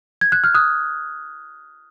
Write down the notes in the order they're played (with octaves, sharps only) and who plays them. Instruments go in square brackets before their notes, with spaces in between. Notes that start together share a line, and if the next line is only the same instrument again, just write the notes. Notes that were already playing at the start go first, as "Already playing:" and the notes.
[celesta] G#6
F#6
F6
D#6 F#6